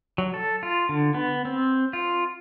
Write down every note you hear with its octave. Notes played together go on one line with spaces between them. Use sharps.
F#3
A4
F4
D3
B3
C4
F4